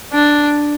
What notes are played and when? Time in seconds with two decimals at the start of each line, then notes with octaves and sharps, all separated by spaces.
0.13 D4